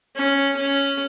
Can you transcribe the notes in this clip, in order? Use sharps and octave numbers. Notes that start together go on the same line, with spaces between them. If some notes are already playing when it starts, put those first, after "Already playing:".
C#4
C#4